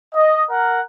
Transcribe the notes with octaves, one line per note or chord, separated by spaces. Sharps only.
D#5
A#4 F#5